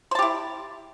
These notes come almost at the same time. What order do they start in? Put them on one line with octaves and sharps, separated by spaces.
C5 A5 G4 E4